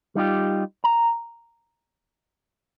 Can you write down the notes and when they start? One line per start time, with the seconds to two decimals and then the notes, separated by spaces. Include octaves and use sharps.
0.15 G3 D#4 F4 G4
0.84 A#5